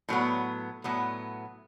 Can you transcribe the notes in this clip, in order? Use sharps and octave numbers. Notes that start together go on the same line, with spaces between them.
A2 F#3 B3
A2 F#3 B3